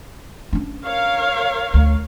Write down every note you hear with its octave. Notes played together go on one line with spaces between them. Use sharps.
C#4 D4
A#4 C#5 F5
D2